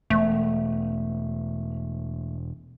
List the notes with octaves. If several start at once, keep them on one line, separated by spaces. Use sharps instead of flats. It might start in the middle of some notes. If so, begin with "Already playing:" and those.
E1 A3